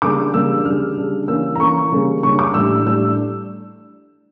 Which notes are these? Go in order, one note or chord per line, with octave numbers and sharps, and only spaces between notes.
C#3 G3 A#3 D4 D6
C#3 G3 A#3 D4 E6
C#3 G3 D4 F6
C#3 G3 D4
E3 A#3 C#4 E6
A#5
E3 A#3 C#4 C#6
C#3 G3 A#3 C#4
C#3 G3 A#3 C#4 C#6
D6
A2 G3 D4 E6
A2 G3 D4 E6